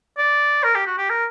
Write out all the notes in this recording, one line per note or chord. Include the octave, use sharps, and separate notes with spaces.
D5
A#4
G4
F#4
G4
A#4